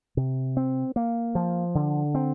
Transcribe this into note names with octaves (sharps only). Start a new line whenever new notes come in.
C3
C4
A#3
F3
D3
C4